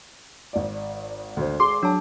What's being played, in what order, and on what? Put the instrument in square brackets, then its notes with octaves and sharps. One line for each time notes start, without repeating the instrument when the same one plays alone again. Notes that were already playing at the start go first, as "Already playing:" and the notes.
[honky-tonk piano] G#1 D5
[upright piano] D2 C5
[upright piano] G#4 [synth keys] C6 [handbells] D6
[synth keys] F#3 [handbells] D4 A5